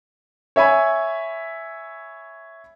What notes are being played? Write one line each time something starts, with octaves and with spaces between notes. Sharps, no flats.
C#5 E5 G#5 B5